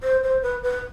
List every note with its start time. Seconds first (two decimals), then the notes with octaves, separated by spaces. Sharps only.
0.03 C5
0.23 C5
0.42 B4
0.63 B4